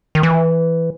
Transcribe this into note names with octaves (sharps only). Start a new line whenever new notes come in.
D#3
E3